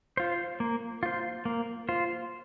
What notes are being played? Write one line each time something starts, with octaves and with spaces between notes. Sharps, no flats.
F4 C5
A#3
F4 C5
A#3
F4 C5